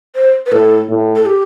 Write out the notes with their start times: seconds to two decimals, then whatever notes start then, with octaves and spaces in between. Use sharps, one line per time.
0.15 C5
0.46 B4
0.52 A2 A4
0.89 A2
1.16 A4
1.26 G4